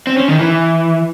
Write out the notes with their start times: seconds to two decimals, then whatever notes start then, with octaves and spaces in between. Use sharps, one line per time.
0.07 C4
0.18 C#4
0.28 D#3
0.39 E3